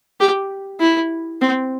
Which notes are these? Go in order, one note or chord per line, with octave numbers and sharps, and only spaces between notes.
G4
E4
C4